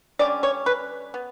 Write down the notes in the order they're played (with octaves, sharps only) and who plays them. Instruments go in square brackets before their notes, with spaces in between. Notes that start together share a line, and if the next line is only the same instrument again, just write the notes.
[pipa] D3 G3 C#4 D5
C#5
B4
B3